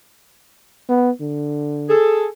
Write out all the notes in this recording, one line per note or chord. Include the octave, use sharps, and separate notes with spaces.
B3
D3
G#4 A4